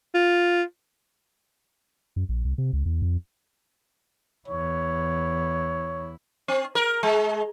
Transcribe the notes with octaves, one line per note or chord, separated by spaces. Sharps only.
F4
F#2
A#1
C2
C3
C#2
E2
F2
E2 E4 C#5
C4
A#4
G#3